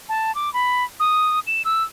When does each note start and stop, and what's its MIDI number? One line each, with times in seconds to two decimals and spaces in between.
0.09 0.34 81
0.35 0.52 86
0.54 0.84 83
1.00 1.40 87
1.47 1.62 100
1.65 1.83 88